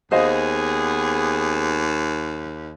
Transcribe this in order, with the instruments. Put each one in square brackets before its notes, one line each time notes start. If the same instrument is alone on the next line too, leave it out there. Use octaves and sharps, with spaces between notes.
[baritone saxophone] D#2 [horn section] B3 G#4 [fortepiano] C5 D#5 F5